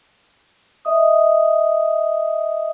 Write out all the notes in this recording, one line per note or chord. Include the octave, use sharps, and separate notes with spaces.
D#5 E5 D#6